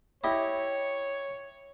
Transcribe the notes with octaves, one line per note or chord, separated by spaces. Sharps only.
E4 G4 C#5 D#5